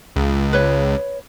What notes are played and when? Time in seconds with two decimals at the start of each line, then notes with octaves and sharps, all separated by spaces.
0.16 C#2
0.53 B4 C#5